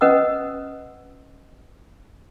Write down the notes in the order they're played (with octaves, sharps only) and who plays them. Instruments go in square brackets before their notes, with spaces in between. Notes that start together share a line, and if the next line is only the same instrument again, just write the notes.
[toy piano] C#4 B4 D#5 F#5 D#6 E6